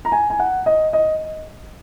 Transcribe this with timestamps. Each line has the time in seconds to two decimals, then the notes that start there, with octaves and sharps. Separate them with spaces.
0.05 A#5
0.12 G#5
0.30 G#5
0.40 F#5
0.66 D#5
0.93 D#5